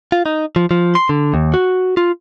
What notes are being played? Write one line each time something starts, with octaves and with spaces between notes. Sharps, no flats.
F4
D#4
F3
F3
C6
D3
D#2
F#4
F4